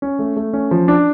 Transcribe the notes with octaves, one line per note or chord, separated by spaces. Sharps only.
C#4
A3
A3
C#4
F3
D4